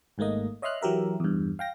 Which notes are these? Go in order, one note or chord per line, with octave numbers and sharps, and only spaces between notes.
G#1 G#2 A3 A#3 D#5
C#5 D#5 E5 C6 F6 F#6
E3 F#3 G4 A#4 E5
E2 G2
F5 G5 A#6